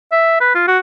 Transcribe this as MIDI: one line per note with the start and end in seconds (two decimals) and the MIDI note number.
0.12 0.37 76
0.40 0.54 71
0.55 0.63 65
0.68 0.78 66